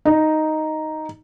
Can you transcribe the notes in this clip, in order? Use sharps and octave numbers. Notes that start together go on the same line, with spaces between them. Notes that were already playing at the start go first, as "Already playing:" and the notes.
D#4